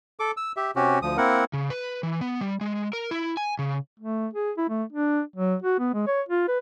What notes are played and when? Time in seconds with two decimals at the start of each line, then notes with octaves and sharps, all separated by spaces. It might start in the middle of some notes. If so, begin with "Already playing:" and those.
0.20 A4 D6
0.37 E6
0.57 G4 E5
0.76 C3 C#4 F#4 G4
1.02 D2 F3 D#6
1.17 A#3 C4 E4 A#4 F#5
1.53 C#3
1.70 B4
2.03 E3
2.21 B3
2.41 G3
2.61 G#3
2.93 A#4
3.11 E4
3.37 G#5
3.59 C#3
4.00 A3
4.33 G#4
4.58 E4
4.69 A3
4.93 D4
5.36 F#3
5.62 F#4
5.79 B3
5.94 G#3
6.07 C#5
6.29 F4
6.48 B4